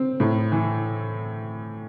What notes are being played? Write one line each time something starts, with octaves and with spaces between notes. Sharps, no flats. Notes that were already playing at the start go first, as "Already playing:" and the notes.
Already playing: C4
A2
E3